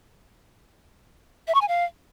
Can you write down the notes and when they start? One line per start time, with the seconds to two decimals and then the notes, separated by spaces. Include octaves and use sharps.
1.48 E5
1.55 C#6
1.61 G#5
1.68 F5